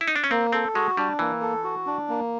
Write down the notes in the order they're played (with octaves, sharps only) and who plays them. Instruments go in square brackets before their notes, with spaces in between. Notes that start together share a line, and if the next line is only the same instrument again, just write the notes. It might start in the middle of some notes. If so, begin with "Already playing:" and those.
[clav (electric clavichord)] E4
D#4
D4
C#4
[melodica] A#3 [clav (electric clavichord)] C4
[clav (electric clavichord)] C4 [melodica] A4
[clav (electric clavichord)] G#3 [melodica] F#4
[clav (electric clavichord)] G3 [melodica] D4
[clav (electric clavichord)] E3 [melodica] A#3
[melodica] A4
F#4
D4
A#3